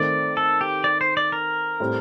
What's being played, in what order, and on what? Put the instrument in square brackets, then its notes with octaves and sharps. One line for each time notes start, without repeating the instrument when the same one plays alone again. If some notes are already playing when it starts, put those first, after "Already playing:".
Already playing: [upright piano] D#3 A3 C4 [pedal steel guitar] D5
[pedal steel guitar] A4
G4
D5
C5
D5
A#4
[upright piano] A2 G3 C4